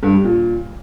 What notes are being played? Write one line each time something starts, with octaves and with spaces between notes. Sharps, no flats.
G2
G3
A#2